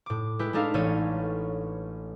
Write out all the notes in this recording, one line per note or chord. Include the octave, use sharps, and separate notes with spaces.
A2 D6
G#3 E4 G4 B4
G#3 A3 D4 D#4 A4 F5
A1 A2 A4 C#5 D#7